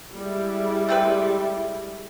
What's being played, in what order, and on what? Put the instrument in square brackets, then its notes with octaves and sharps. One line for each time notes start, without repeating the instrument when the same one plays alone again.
[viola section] G3 G#3 E4
[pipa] A3 C4 B4